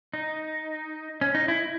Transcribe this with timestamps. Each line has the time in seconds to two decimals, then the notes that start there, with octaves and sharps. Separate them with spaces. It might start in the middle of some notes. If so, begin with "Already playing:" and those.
0.14 D#4
1.21 C#4
1.35 D#4
1.48 E4